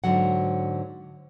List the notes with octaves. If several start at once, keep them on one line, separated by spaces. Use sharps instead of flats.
G#2 D3 D#3 F#3 F#5